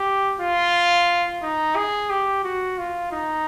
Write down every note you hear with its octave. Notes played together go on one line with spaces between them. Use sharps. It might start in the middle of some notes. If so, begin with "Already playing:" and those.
Already playing: G4
F4
D#4
G#4
G4
F#4
F4
D#4